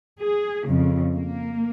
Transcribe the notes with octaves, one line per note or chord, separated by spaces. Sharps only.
G#4
F2 C#3
A#3